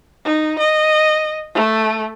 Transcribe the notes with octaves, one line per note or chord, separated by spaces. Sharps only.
D#4
D#5
A3